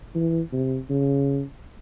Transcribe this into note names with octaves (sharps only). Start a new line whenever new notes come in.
E3
C3
C#3